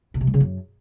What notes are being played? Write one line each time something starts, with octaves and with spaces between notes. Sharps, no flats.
B2
C3
G3
C#3
F#2